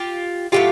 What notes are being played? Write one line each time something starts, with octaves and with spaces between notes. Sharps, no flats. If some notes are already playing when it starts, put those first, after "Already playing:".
Already playing: F4 G4
A2 F#3 A3 F4 G4